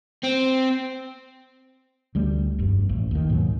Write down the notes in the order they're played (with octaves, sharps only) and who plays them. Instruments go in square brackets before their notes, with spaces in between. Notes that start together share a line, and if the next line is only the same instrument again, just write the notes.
[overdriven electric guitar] C4
[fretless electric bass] D2 G3 A3
F1 G2
A1
D#2 D#3
D#2 G#2 B2 F#3